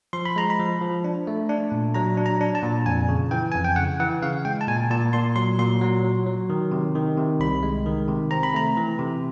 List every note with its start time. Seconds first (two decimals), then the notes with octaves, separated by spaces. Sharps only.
0.13 F3 C6
0.26 B5
0.36 G#3 A#5
0.50 B5
0.59 F3
0.81 F3
1.04 D4
1.27 A3
1.49 D4
1.72 A#2
1.94 F#3 A#5
2.17 D4
2.26 A#5
2.41 D4
2.55 A5
2.63 A#2
2.86 F2 G#5
3.08 C#3
3.31 E3 G5
3.52 F2 G#5
3.65 G5
3.76 C#3 F#5
4.00 E3 F#5
4.22 C#3 F5
4.45 G#3 G5
4.61 A5
4.67 A#2 G#5
4.90 A#2 A5
5.13 A#2 C6
5.36 F#3 C6
5.59 A#2 C6
5.81 F#3
6.04 F#3
6.27 F#3
6.50 D#3
6.72 C3
6.95 D#3
7.18 C3
7.40 C2 B5
7.63 G#3
7.86 D#3
8.08 C3
8.31 C4 A#5
8.43 B5
8.54 A3 A#5
8.77 E3
8.99 C3